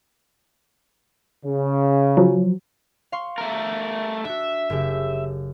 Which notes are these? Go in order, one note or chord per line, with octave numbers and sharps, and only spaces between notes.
C#3
F3 F#3
F5 C6 C#6
A3 A#4
D4 F#4 E5
F#1 C#3 G4